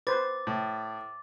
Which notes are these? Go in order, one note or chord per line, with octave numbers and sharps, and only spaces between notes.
B4 C5 D6 A6
A2